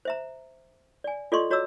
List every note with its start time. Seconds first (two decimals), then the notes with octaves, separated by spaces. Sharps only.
0.05 C5 E5 A#5
1.04 D5 G#5
1.32 F4 A4 D5 D#5 C6 C#6
1.50 F#4 C#5 D#5 A#5 D6 E6